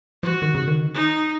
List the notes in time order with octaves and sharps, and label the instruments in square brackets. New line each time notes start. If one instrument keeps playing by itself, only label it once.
[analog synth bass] F3 [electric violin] F#4
[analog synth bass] D#3
C#3
D#3
[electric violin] D#4